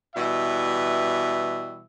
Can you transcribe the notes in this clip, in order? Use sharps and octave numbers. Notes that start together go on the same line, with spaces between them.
B2 E3 G3 E5